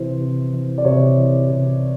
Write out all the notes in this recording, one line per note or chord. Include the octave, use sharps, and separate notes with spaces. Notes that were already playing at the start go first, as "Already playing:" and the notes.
Already playing: C3 E3 C5
C3
E3
D5
C3 C#5
E3
C3